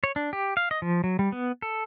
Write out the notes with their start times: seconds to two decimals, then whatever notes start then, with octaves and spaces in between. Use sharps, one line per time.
0.04 C#5
0.16 D4
0.33 G4
0.57 F5
0.71 D#5
0.82 F3
1.04 F#3
1.19 G3
1.32 B3
1.62 A4